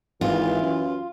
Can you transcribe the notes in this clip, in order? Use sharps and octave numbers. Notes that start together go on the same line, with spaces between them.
G#1 E3 F4
F#2